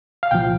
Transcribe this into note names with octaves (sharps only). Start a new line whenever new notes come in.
F5
C2 A#2 F3 G5